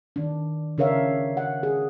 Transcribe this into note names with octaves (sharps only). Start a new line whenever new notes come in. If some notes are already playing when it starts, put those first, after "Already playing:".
D#3 D4
C#3 D4 A#4 C#5 E5 F5
F#5
G#4